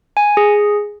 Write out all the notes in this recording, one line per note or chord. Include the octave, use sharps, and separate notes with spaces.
G#5
G#4